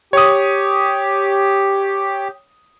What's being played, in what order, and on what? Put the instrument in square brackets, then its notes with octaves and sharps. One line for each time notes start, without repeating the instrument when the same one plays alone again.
[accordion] G4 [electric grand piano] C#5 D#6